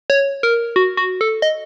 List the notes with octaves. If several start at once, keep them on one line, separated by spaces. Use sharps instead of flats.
C#5
A#4
F#4
F#4
A4
D#5